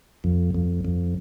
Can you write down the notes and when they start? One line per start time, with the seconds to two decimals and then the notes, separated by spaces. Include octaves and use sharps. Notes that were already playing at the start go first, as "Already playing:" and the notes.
0.24 F2
0.54 F2
0.85 F2